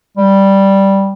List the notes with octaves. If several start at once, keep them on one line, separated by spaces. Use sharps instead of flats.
G3